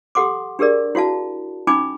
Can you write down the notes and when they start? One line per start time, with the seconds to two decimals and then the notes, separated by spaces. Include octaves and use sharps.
0.15 G4 A4 F#5 C6 D6
0.59 D4 G4 G#4 A#4 D5
0.95 E4 F#4 F5 A5
1.67 C#4 D#4 G#5 B5 D6